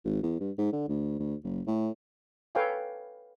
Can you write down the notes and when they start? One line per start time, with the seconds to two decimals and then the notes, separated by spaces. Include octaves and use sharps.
0.04 G#1
0.22 E2
0.40 G2
0.58 G#2
0.72 D3
0.88 D2
1.19 D2
1.43 F#1
1.67 A2
2.55 A4 B4 C#5 F5 G5 G#5